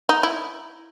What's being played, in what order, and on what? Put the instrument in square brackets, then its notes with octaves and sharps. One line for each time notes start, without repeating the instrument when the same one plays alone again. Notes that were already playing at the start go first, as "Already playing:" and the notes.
[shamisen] D#4
E4